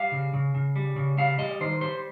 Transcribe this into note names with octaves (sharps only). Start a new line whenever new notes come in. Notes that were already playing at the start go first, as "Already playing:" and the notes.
Already playing: G3 F5
C#3
C#3
C#3
G3
C#3
G3 F5
G3 D#5
D#3 C5
G3 C5